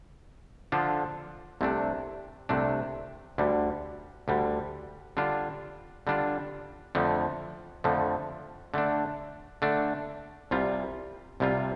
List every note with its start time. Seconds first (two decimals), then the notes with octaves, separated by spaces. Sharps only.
0.72 D3 F3 D4 F4 A4
1.61 C2 C3 A3 D4
2.49 C2 C3 A3 D4
3.38 D2 D3 G3
4.28 D2 D3 G3
5.17 D3 G3 D4 F4
6.07 D3 G3 D4 F4
6.95 F2 D3 F3 A3
7.84 F2 D3 F3 A3
8.74 D3 A3 D4
9.62 D3 A3 D4
10.51 C2 C3 G3 F4
11.40 C2 C3 G3 F4